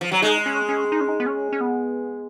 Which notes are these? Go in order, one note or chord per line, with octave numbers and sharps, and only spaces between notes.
F3
F#3
G#3 D#4
C#4
C#4
D#4
C#4
D#4
B3
C#4
C#4
B3